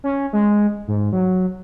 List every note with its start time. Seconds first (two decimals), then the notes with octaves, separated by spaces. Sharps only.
0.04 C#4
0.33 G#3
0.88 G#2
1.13 F#3